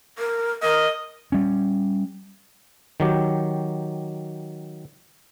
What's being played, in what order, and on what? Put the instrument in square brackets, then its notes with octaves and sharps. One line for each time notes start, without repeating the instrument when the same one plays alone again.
[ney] A#4
[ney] A#4 [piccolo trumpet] D#5
[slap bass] G3 C#4
[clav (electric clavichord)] D#3 F#3 G4